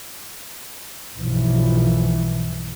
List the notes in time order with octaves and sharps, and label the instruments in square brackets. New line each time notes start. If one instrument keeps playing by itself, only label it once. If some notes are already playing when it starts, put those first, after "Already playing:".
[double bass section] B1 G2 E3 F3